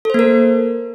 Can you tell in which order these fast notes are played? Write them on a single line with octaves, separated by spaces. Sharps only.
A4 C5 A#3 A#4